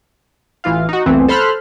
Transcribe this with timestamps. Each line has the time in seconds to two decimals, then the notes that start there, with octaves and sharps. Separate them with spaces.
0.64 A1 E3 F4 F5
0.89 D#4 F#4
1.06 C2 F2 A2 E3 B3 C4
1.28 A4 C5 B5 C6 F6 F#6